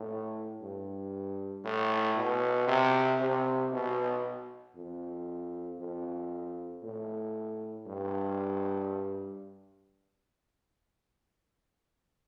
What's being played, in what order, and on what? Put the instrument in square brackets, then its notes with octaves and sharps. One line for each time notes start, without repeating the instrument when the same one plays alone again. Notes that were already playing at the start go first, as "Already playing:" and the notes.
Already playing: [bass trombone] A2
G2
A2
B2
C3
C3
B2
F2
F2
A2
G2